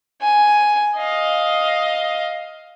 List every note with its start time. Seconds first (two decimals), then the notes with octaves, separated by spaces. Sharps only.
0.21 G#5
0.97 D#5 F5